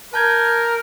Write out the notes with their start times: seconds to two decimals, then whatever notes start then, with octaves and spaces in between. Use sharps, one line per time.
0.14 A#4 A5 G6 G#6